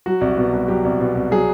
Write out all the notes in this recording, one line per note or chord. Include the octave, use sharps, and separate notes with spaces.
F#3 F#4
C2
B2
C2
F#3 G4
C2
B2
C2
F#3 G#4